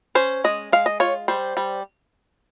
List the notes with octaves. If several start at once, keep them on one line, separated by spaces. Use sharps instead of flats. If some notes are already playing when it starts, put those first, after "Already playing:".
C#4 C5
G#3 D#5
G#3 F5
D#5
F4 C#5
G3 C5
G3